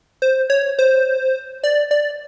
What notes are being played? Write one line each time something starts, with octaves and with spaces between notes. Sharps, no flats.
C5
C#5
C5
D5
D5